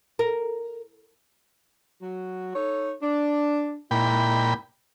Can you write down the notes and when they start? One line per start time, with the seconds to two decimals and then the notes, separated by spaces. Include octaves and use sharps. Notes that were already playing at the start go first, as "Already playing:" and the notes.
0.19 A#4
2.01 F#3 F#4
2.54 D#4 A4 C#5
3.01 D4
3.91 A#2 G#3 D#4 E4 G5 B5